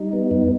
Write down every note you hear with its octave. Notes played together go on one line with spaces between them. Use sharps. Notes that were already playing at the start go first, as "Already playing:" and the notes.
Already playing: G3 D#4
B3
F#2 D#4